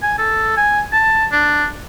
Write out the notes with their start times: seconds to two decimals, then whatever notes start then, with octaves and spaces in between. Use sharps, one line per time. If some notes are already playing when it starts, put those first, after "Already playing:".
0.03 G#5
0.18 A4
0.57 G#5
0.93 A5
1.32 D4